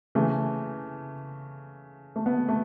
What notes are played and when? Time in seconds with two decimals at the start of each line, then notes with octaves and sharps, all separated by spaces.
0.15 C#3 E3 A3
2.16 A3
2.26 B3
2.48 A3